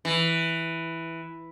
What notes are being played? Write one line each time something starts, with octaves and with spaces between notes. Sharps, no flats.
E3